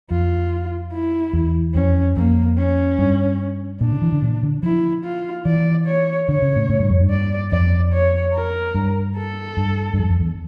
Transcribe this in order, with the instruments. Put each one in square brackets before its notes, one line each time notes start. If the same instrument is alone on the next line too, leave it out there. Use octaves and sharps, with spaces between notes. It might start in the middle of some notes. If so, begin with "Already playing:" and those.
[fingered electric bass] F2 [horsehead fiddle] F4
[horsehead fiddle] E4
[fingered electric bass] E2
[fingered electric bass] F2 [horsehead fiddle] C#4
[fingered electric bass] F2 [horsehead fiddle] A#3
[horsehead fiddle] C#4
[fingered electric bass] G2
[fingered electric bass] A#2 [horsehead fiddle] D4
[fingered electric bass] C#3
E3
D3
A#2
D3
[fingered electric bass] F3 [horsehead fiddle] E4
[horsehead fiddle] F4
[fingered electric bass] E3 [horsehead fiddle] D5
[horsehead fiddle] C#5
[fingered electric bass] D3 [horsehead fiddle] C#5
[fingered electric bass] C#3
A2
A2
G2
F2
G2
[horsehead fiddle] D5
[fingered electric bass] F2 [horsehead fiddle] D5
[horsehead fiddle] C#5
A#4
[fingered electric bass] G2
[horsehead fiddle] A4
[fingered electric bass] G2
G2
F2
F2
E2